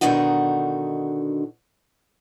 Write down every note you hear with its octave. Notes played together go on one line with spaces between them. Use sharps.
B2 D3 D#3 D4 D#4 F#4